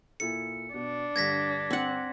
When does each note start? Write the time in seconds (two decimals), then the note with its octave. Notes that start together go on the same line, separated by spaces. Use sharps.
0.20 A#2 E4 A4 C#7
0.74 B2 D4
1.16 G2 D3 G#6 A#6 B6
1.70 C4 F#5